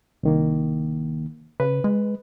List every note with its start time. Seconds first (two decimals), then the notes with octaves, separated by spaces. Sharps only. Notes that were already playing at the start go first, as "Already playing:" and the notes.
0.23 C2 D#3 A#3
1.60 C#3 B4
1.84 G#3